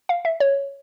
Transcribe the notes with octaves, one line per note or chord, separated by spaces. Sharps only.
F5
E5
C#5